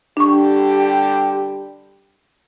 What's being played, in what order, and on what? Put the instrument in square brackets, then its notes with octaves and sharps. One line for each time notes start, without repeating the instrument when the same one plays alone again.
[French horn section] D3 G3 G4 [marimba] D4 C#6